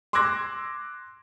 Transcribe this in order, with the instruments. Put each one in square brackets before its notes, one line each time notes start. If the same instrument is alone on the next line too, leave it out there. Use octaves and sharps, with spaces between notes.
[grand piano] C6 D6 E6 F#6 G#6 A#6